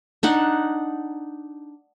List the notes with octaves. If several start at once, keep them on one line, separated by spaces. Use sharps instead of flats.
D4 D#4 F#5